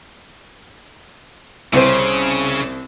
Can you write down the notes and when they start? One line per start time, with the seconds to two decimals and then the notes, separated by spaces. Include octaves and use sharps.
1.73 C2 C#3 C5